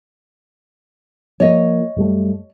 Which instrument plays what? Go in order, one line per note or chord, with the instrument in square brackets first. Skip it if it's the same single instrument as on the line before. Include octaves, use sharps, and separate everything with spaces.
[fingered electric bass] F3 A#3 [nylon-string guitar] C#5 D#5
[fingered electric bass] F#2 G3 A3